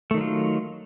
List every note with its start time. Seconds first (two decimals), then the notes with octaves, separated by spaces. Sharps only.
0.11 A3
0.14 D#3
0.17 F#3
0.21 F4